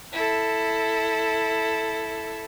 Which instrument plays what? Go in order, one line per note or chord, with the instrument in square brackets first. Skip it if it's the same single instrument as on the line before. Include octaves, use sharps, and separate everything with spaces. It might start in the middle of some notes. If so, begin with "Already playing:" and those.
[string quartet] E4 A4